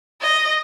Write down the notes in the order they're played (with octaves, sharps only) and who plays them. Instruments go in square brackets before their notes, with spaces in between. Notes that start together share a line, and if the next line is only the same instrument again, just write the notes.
[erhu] D#5